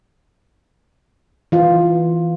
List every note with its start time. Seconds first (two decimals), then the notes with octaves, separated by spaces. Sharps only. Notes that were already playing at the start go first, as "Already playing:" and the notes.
1.52 E3 F4